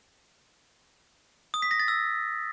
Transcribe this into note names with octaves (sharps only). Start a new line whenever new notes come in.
D#6
B6
A#6
A6
E6